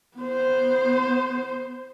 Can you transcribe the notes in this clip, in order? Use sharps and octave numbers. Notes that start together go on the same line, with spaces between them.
B3 C5